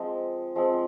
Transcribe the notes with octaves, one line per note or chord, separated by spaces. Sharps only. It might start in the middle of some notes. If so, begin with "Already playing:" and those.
Already playing: F3 G#3 C4
F3 G#3 C4